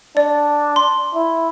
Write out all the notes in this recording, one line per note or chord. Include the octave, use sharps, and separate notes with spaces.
D4 D5
C6
E4